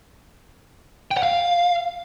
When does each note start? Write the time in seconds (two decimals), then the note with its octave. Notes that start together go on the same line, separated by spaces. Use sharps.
1.11 G5
1.17 F#5
1.23 F5